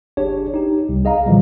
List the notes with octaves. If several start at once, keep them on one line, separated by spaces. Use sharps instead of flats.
G1 D4 G4 G#4 C#5
D#4 G4
C2
G#4 D#5 F5 A#5
A#2 D3 E3 F3 G3